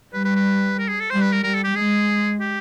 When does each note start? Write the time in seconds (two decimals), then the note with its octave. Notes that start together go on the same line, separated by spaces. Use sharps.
0.13 G3 B4
0.25 B4
0.36 B4
0.79 A#4
0.89 G#4
1.00 A4
1.10 G3 C5
1.21 B4
1.32 A#4
1.43 G3 A#4
1.55 A4
1.64 G4
1.75 G#3 G#4
2.40 G4